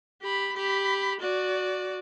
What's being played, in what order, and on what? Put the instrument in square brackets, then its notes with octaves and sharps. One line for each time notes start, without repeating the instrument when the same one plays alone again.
[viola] G4 B5
G4 B5
F#4 D5